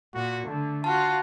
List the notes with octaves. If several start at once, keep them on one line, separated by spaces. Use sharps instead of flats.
A#2 F#4
D3 A3
F4 F#4 F5 A5